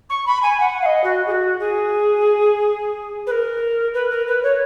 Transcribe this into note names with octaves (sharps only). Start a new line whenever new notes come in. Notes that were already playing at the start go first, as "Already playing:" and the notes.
C#6
B5
G#5
F#5
F5
D#5
F#4
G#4
F#4
G#4
B4
A#4
B4
A#4
B4
C#5